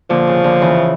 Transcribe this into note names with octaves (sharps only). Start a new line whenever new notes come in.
A#2 D3 F3
C#3
A#2 D3
C#3 E3